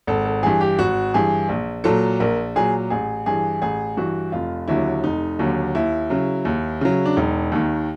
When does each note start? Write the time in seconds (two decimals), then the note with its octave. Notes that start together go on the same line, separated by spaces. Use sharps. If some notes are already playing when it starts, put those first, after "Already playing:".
0.07 G#1 A4
0.25 A4
0.43 G2 E3 G#4
0.61 G4
0.79 G#1 F#4
1.14 G2 E3 G#4
1.49 A#1
1.84 A#2 F#3 A4
2.20 A#1 A#4
2.56 A#2 F#3 G#4
2.90 A1 G#4
3.26 G2 E3 G#4
3.62 A1 G#4
3.97 G2 E3 F#4
4.32 F1 F4
4.68 D#2 D3 F#3 E4
5.04 F1 D#4
5.39 D#2 D3 F#3
5.75 D#2 E4
6.10 C#3 F#3
6.45 D#2
6.81 C#3 F#3
7.06 D4
7.16 E1 D#4
7.52 D#2 D#3